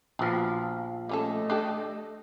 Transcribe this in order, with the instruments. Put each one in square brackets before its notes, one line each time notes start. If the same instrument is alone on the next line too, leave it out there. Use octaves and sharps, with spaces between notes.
[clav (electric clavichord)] A#1 F3 F5 [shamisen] F#3 B3
[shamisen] G3 C#4 A4 [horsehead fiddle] A3 D#5
[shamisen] D4 G4 A4